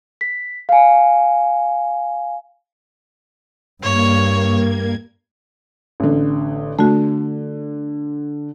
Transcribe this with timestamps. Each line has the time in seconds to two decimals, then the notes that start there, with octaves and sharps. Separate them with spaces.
0.21 B6
0.69 F5 G#5
3.83 G2 A#3 C#5 G#6
6.00 A1 D3
6.79 D3 A3 F#4